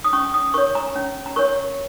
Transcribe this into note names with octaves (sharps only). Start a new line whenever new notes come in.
D#6
C#4 C#6
D#6
A#4 C#5 C#6
A#5
C#4
A#5
A#4 C#5 C#6